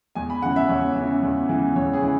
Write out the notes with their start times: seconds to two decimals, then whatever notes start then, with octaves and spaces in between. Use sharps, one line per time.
0.15 E2 G#5
0.30 B5
0.42 C#3 E3 F#5
0.56 E5
0.69 E2 C#5
0.96 C#3 E3
1.22 E2
1.49 C#3 E3
1.76 E2 C#5
1.93 G#4
2.02 C#3 E3